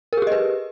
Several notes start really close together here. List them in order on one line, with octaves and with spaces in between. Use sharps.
A#4 G#4 G4 D#5 B4